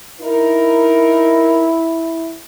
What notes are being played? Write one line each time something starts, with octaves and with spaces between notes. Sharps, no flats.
D#4 E4 A#4